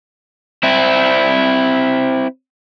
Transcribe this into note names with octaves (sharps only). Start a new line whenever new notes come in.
C4 E4